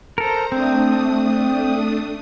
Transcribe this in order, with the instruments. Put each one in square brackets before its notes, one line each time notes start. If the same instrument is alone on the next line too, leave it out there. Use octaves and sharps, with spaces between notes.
[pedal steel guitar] A4 A#4 [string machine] C5 A#5
[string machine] A3 D4 D#6 [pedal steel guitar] C4